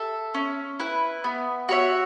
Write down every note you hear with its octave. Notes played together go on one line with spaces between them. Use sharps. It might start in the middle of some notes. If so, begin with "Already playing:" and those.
Already playing: A4 E5
C#4
E4 B4
B3
F#4 C#5 E5